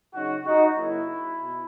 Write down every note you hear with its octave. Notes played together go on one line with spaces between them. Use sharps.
C#3 F#3 C#4 D#4 F#4
D#4 F#4
C#3 F#3 A#3 E4
B2